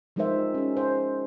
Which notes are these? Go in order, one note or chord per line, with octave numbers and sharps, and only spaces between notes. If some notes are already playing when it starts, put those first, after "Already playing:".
F3 G#3 D#4 A#4 C5 E5
C#4 G#4
C5